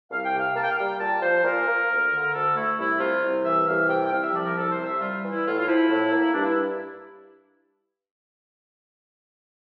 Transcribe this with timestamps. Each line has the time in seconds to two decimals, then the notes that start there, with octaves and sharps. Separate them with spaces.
0.11 C2 F5
0.24 G5
0.33 C3
0.39 F5
0.55 A#3 A5
0.62 G5
0.69 F5
0.77 G3 G5
0.99 A#2 A5
1.15 D5
1.22 F3 C5
1.44 A#2 A#4
1.67 A#3
1.89 D2
2.11 D3
2.33 D2 A4
2.55 A3 E4
2.78 C2 E4
3.00 C3 F4
3.22 C2
3.44 E3 E5
3.67 C2 F5
3.88 C3 G5
4.05 G5
4.11 C2 F5
4.22 E5
4.33 F3 D5
4.45 A#4
4.56 C2 A4
4.70 C5
4.78 C3
4.86 E5
5.00 G3 F4
5.23 E3
5.31 E4
5.45 A2 F4
5.58 F4
5.67 F3 E4
5.90 A2
6.12 A#3
6.34 G2 D4
6.45 E4